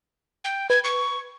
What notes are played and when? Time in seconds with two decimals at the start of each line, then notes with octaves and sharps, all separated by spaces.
0.44 G5
0.70 B4 G#6
0.84 C#6